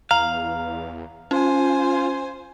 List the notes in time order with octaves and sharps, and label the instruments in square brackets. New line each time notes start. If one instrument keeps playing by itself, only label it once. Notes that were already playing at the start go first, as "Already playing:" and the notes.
[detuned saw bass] E2 [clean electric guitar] F5 [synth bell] A#5
[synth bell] C#4 [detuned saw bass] F4 [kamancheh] C5 G#5